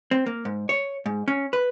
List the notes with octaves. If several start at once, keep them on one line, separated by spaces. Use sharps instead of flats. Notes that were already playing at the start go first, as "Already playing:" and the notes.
C4
A#3
G#2
C#5
G#2
C#4
B4